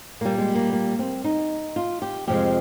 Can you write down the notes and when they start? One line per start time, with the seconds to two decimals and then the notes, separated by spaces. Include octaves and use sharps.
0.21 A#2 G3 A#3
0.38 G#3
0.55 A#3
0.73 A#3
0.99 C4
1.24 D#4
1.76 F4
2.02 G4
2.27 F2 C3 F3 G#3 G4